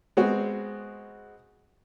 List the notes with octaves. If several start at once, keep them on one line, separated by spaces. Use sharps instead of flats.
G#3 B3 C4 F#4